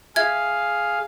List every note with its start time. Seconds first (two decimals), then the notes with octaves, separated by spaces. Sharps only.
0.16 G#4 E5 F5 G#6